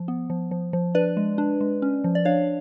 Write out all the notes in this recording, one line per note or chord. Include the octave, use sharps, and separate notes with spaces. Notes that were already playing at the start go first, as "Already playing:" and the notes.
Already playing: F3
B3
F3
F3
F3
D4 B4 D5
G#3
D4
G#3
C#4
F3
D5
D4 C#5 F5